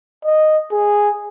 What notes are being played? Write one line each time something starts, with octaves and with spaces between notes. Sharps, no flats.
D#5
G#4